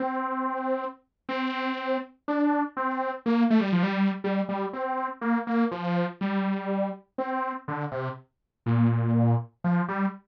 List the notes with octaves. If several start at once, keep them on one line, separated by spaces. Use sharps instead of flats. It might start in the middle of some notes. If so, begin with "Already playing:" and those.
Already playing: C4
C4
D4
C4
A#3
A3
G3
F3
G3
G3
G3
C4
A#3
A#3
F3
G3
C4
D3
C3
A#2
F3
G3